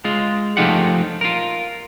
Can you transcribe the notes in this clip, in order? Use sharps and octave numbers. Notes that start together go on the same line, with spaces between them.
G#3 F4
F3 A3 D#4 F4 G4 F#5
F4 A#4